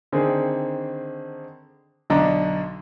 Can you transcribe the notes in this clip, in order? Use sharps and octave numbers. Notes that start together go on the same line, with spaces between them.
D3 D#3 C4 G#4
B1 D3 D4 D#5 A#5 D6